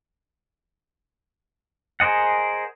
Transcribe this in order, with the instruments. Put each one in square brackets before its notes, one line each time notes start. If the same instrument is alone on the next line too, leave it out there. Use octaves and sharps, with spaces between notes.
[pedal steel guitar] G#4 A#4 C5 D#5 F#5